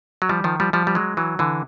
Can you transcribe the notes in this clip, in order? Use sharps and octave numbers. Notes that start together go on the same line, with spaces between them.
F#3
F3 G3
D#3 F3
F3 G3
F3 G3
G3
F#3 G#3
E3 F#3
D3 E3